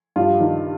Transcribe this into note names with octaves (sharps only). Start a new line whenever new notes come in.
G2 F4
D#3